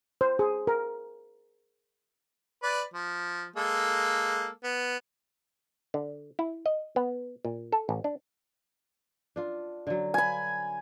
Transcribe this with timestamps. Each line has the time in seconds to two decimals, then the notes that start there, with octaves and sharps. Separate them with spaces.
0.21 C5
0.39 G#4
0.67 A#4
2.63 B4 D5
2.94 F3
3.56 G#3 A#3 A4
4.64 B3
5.94 D3
6.39 E4
6.66 D#5
6.96 B3
7.45 A#2
7.72 A4
7.89 A1
8.04 D4
9.36 D4 F4
9.87 D3 F#3
10.14 G#5 B5